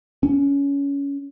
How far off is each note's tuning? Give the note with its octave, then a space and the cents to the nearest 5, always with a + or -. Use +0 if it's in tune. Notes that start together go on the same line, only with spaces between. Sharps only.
C#4 +20